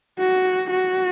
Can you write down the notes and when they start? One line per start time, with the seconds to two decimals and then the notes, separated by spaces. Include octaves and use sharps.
0.19 F#4
0.71 F#4